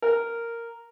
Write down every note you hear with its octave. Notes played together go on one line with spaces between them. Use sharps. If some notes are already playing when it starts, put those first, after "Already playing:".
A#4